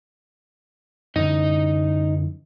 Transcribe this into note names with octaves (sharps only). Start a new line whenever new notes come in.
F#2 D3 E3 D#4 D#5